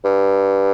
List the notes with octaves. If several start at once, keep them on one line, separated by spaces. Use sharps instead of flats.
G2